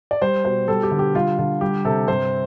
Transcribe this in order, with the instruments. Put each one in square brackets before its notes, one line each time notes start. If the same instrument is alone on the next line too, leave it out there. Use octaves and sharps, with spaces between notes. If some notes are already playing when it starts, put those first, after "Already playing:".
[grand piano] D5
G3 C5
B2 C5
G3 A4
G4
D3
G4
G3 F4
D3 F4
G3 G4
C3 A4
G2 C5